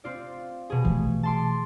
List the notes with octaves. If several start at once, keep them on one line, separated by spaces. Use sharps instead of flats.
C4 F4 D5
B2 G#4
E3 A3
A5 C6 D6